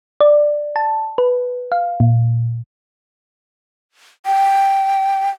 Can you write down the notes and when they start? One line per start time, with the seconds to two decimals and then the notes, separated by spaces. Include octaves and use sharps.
0.20 D5
0.76 A5
1.18 B4
1.72 F5
2.00 A#2
4.26 G5